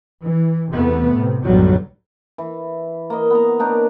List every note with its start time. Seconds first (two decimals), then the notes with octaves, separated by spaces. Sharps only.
0.21 E3
0.71 E2 C3 A3 B3
1.12 A2 C3
1.45 B1 F#2 A2 D3 F#3 G3
2.38 E3
3.10 A#3 D#5
3.30 B3 A#5
3.59 A#3 D4 D#4 C#5